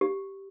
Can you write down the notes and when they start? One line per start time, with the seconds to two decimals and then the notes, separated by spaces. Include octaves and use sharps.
0.01 G4